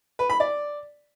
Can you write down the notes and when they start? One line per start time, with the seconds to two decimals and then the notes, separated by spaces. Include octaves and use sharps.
0.19 B4
0.30 B5
0.40 D5